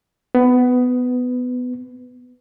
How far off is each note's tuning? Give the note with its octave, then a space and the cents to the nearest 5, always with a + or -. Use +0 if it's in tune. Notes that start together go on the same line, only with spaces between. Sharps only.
B3 +15